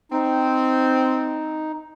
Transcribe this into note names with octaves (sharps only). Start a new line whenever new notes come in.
C4 D#4